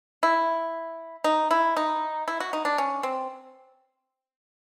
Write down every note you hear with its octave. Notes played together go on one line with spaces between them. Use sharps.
E4
D#4
E4
D#4
E4
F#4
D#4
D4
C#4
C4